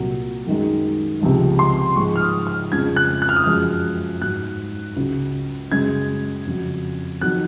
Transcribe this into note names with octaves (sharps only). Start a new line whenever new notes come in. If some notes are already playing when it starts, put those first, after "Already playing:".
Already playing: C2 A#2 F#3
F#2 D#3 G#3
C#2 C3 F3 G#3
C6
G#2 F3 G#3 C#6
F6
D#6
F6
F2 C#3 F3 G#3 G#6
F#6
F#6
F6
D#6
F#2 F3 G#3 F6
G#2 F#3 F#6
C#2 C#3 F#3
F#2 C#3 G#3 G#6
F2 C#3 F#3
F2 D#3 F#3 F#6